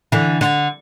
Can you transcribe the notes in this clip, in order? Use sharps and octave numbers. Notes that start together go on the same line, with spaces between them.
D3 E3
D3